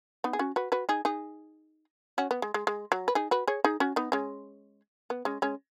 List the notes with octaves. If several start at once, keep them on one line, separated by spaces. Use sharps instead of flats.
B3 D#4
G#4
C#4 F#4
F#4 B4
F#4 B4
D#4 G#4
D#4 G#4
C#4 F#4
B3
G#3
G#3
G#3
F#3
B4
D#4 G#4
F#4 B4
G#4 C#5
D#4 G#4
C#4 F#4
B3 D#4
G#3 C#4
B3
G#3 C#4
G#3 C#4